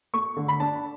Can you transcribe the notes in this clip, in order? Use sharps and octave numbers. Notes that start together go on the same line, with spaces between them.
A3 C#6
D3
B5
D4 A5